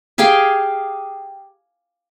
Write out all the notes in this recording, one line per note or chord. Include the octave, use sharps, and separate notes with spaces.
G4 G#4 F5 G5